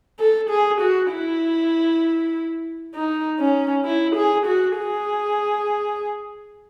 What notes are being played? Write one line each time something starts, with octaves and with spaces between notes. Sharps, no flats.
A4
G#4
F#4
E4
D#4
C#4
E4
G#4
F#4
G#4